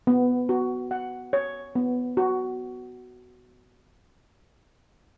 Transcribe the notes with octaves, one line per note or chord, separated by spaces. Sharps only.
B3
F#4
F#5
C#5
B3
F#4